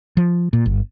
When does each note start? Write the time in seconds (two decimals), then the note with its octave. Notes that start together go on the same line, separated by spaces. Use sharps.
0.17 F3
0.53 A#2
0.66 G1